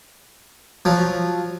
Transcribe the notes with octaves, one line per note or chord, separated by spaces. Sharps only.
F3 F#3